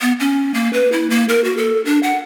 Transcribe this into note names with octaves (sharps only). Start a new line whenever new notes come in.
B3
C#4
A#3
B4
E4
A#3
A#4
F#4
A4
D4
F#5